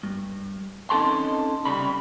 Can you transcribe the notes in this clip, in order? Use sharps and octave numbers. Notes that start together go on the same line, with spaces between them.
G2
C4 C#4 D#4 A4 A5 C6
C2 C#3 G3 B5